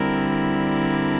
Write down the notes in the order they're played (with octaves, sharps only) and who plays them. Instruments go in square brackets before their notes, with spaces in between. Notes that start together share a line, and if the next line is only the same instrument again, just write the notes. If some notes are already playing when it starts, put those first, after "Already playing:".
Already playing: [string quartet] D3 G3 C4 E4 A#4
A#4